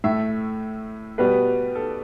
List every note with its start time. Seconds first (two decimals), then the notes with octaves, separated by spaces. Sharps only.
0.04 A2 A3 E5
1.18 B2 G3 B3 B4
1.76 A4